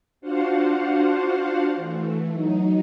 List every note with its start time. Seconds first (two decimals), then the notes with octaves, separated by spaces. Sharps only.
0.21 D4 F4 F#4 C5 F5 F#5
1.76 E3 A3
2.31 F#3 D#4